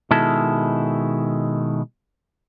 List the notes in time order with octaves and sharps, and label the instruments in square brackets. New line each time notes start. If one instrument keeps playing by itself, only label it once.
[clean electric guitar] B2 D#3 G#3 E4 A4